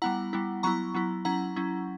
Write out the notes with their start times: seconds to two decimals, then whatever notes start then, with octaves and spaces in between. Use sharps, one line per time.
0.02 G3 B3 E4 F#5 A#5
0.33 G3 B3 E4
0.63 F#3 B3 E4 A#5 C#6
0.94 F#3 B3 E4
1.25 F#3 C#4 E4 F#5 A#5
1.56 F#3 C#4 E4